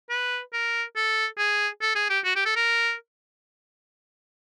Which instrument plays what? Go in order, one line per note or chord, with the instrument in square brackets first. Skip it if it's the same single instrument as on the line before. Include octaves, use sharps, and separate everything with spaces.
[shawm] B4
A#4
A4
G#4
A4
G#4
G4
F#4
G4
A4
A#4